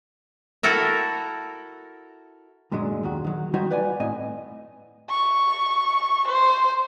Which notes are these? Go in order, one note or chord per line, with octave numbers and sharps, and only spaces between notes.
E4 F#4 A4 A#4 E5
F#2 A#2 D3 F#3 G#3
D#2 D#3 F#4
D#3 F#3
D#3 G3 D#4 F#4 C5 C#5
B4 D5 F#5 G#5
A2 C4 D#5 G#5
C#6
C5